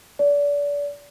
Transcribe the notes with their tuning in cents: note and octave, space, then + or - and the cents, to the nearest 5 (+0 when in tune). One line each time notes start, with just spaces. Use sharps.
D5 -30